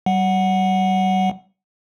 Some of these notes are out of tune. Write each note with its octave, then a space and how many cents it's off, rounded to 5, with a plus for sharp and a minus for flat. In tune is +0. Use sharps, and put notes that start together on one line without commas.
G3 -40 F#5 +0